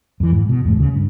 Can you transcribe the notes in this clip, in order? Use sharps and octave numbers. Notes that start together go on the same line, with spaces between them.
F2 E3
G#2
B2
E2 G#2 A3
D2 C#3
G2